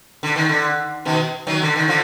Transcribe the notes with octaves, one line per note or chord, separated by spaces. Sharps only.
D3
D#3
D3
B2 D#3
D#3 F#3
D3
D#3
D3 F3